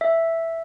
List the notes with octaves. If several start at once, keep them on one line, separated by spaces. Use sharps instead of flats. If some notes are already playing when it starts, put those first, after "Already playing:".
E5